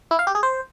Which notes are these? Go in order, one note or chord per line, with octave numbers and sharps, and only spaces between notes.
E4
F5
G4
G#4
C5